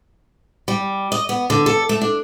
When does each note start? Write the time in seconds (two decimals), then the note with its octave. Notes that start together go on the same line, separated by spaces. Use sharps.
0.68 G3
1.12 D#5
1.29 B3
1.50 D3
1.66 A4
1.89 A3
2.01 D4